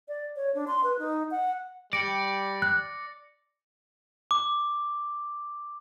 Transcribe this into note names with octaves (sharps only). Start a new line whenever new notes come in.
D5
C#5
D4
C6
B4
D#4
F#5
G3 D5 A#6 C#7 D7
F#6
D6